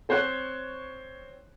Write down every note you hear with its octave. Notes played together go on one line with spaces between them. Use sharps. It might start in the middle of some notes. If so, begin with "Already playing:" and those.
C4 C5 C#5 F#6